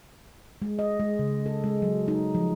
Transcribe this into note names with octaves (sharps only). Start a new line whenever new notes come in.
G#3
D#5
G#3
C#3
A4
G#3
F#3
D#4
F3